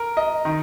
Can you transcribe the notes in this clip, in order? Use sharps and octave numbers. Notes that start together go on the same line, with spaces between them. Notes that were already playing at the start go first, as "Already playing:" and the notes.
Already playing: A#4
D#5
D#3